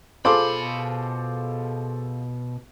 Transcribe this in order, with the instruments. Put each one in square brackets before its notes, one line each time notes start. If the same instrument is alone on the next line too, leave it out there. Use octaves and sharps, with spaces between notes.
[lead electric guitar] B2 B5 [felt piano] F4 G#4 A4 [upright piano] C5 C6 D6